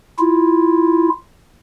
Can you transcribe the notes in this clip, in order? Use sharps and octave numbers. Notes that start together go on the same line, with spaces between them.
E4 F4